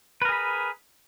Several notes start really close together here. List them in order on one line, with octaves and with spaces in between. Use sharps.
B4 A#4 G#4 B5